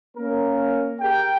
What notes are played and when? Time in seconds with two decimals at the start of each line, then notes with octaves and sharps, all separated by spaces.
0.17 A#3 C#4 A#4
1.01 G4 G#4 A#4 G5